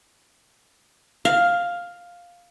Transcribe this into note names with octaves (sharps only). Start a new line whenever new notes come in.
F5